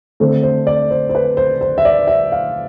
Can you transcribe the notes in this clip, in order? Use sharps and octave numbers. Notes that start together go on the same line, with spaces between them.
D3 A3 C4 C5
C5
D5
C5
C5
B4
C5
C5
E5
D5
E5
F5